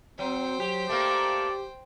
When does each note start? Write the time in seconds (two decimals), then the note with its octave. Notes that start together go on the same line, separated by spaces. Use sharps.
0.19 F#3 C4 C5 G5
0.60 F#3 G4
0.89 A3 A#3 G4 D5